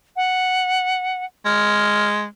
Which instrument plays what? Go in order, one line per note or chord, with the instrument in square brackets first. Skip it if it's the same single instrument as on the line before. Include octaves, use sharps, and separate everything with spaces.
[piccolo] F#5
[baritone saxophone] G#3 [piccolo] F6